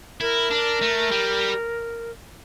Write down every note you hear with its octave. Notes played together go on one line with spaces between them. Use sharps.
E4 A#4
D4
A3
G3